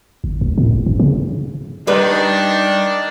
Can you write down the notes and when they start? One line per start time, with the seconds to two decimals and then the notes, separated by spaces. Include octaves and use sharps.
0.24 G1
0.41 C#2
0.58 A2
0.73 F#1
0.86 G2
1.00 C#3
1.87 D#3 G3 D4 D#4 B4